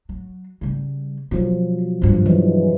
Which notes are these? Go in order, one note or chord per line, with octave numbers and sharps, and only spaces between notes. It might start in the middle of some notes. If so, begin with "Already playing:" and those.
F#3
C#3 G3
B2 F3 F#3 F4
G2 F3 C4
E3 F#3 G#3